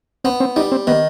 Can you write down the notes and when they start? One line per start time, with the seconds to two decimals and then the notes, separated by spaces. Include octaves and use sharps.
0.24 B3 C4
0.40 C4
0.56 G3 D#4
0.72 C4
0.87 D#3 B3